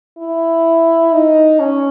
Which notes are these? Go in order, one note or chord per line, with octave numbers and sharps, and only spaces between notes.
E4
D#4
C#4